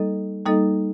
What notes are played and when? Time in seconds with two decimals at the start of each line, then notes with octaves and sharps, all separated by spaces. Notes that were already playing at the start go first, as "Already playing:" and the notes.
Already playing: G3 A#3 D#4 A4 D#5
0.46 G3 A#3 D#4 A4 D#5